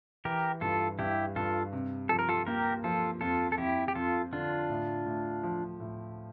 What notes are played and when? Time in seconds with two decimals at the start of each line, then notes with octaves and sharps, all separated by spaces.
0.25 E3 G4 A#4
0.61 G2 F4 A4
0.99 G2 E4 G4
1.36 G2 F4 A4
1.73 C3
2.09 F3 A4
2.19 A#4
2.29 F4 A4
2.47 A#3 G4 A#4
2.84 F3 F4 A4
3.21 F2 F4 A4
3.52 A4
3.58 F2 E4 G4
3.88 G4
3.95 F2 F4 A4
4.33 D3 D4 F4
4.69 A2
5.06 A2
5.43 F3
5.80 A2